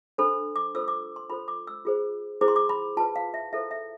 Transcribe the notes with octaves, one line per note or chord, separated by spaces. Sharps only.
D4 A4 C5 B5
D6
F4 A4 C5 E6
D6
C6
F4 A4 C5 B5
D6
E6
F4 G#4 C5
E4 G#4 C5 D6
C6
D6
B5
F4 B4 A5
F5
E5
E4 A4 C5 E5
E5